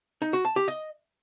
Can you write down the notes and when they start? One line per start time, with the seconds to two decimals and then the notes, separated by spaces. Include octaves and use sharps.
0.22 D#4
0.33 F#4
0.45 A5
0.56 G4
0.68 D#5